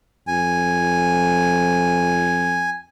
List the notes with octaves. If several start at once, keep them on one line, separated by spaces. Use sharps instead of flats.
F2 G#5